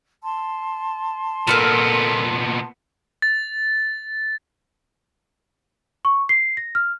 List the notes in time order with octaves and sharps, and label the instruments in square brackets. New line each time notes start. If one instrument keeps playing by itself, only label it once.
[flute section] A5 C6
[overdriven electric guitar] A#2 B3 [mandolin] F4 A4 A#4
[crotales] A6
[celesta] C#6
C7
A#6
F6